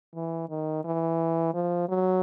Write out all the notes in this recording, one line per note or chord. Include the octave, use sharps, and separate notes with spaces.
E3
D#3
E3
F3
F#3